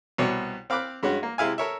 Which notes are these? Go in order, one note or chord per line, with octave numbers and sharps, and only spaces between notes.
C2 B2 B3 C#5 D5
C4 F5 B5 D6 F#6
G2 G#3 C#4 F#4
A#3
C3 G#3 E4 F5 G#5
A4 A#4 C#5 E5